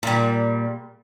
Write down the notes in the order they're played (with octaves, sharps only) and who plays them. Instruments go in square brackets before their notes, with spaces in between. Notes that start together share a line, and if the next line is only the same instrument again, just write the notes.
[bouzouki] A#2 G3